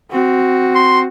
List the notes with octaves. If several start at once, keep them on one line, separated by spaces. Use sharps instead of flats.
C4 F#4
C6